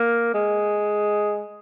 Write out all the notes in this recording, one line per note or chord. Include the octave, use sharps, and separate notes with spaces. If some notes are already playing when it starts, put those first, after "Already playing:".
Already playing: A#3
G#3